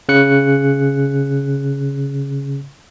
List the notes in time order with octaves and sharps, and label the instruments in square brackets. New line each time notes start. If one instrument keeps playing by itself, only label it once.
[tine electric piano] C#3 F#6 C#7